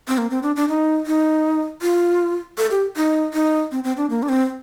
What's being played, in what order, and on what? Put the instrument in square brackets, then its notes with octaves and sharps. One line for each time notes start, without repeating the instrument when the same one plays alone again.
[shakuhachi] C4
A#3
C4
D4
D4
D#4
D#4
F4
A4
G4
D#4
D#4
C4
C4
D4
A#3
D4
C4